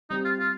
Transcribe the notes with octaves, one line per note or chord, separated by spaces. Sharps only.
G3 C4 D#4 G4
F4
F4